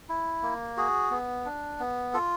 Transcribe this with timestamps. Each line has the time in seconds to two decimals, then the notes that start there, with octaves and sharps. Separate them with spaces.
0.09 E4
0.43 A#3
0.77 F#4 G#4
1.11 B3
1.45 D4
1.80 B3
2.13 F4 A4